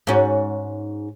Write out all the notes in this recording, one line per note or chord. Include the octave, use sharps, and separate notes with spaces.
G#2 C#4 F#4